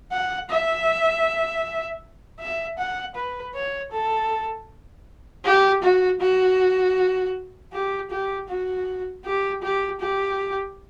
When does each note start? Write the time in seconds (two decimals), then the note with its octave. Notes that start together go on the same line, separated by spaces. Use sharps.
0.12 F#5
0.50 E5
2.39 E5
2.78 F#5
3.16 B4
3.55 C#5
3.92 A4
5.45 G4
5.83 F#4
6.20 F#4
7.73 G4
8.11 G4
8.48 F#4
9.25 G4
9.62 G4
10.00 G4